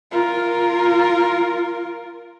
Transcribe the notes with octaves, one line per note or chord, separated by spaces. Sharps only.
F4 A#4